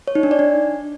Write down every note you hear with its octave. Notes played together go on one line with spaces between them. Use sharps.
C#5
D#4
D4
D5
D4